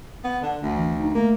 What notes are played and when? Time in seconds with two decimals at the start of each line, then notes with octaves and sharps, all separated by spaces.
0.24 B3
0.42 D3
0.62 D2
0.75 E3
0.99 D#4
1.15 A3 A#3